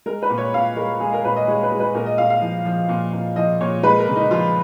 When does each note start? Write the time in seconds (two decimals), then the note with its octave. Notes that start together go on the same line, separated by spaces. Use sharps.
0.06 G#3 A#4
0.22 B4
0.30 A#2
0.38 C#5
0.54 A#2 F5
0.77 G#3 A#4
1.00 G#3 G#4
1.13 A#4
1.24 A#2 B4
1.36 D#5
1.48 G#3 C#5
1.63 B4
1.72 G#3
1.80 B4
1.94 A#2 A#4
2.06 D#5
2.18 A#2 F5
2.30 F5
2.42 F3
2.65 F3
2.89 A#2
3.13 A#2
3.36 F3 D#5
3.61 A#2 C#5
3.83 G#3 B4
3.99 A#4
4.08 C#3
4.16 D#4
4.31 F3 F4